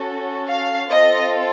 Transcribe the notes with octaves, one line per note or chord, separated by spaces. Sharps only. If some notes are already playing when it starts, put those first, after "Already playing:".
Already playing: C#4 F#4 A4
F5
C4 F4 A4 D#5